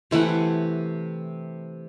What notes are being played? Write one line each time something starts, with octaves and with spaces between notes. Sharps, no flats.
C3 E3 A3 F#5